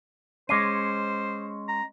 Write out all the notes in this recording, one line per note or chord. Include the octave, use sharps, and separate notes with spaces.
G#3 C#4 C5 D6 C7 D#7
A#5